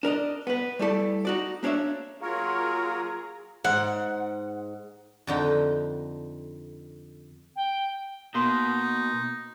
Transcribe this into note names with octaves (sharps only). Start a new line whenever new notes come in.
D4 A#4 D5 D#5
B3 B4
G3 A3 E4 A4 D5
D#4 F#4 D5
A#3 D4 C#5 D5 E5
F#3 A#3 F4 G#4 A#4 C#5 A#5
G#2 F#5
F2 D3 D#4 G5
G5
B2 A#3 D#4 C6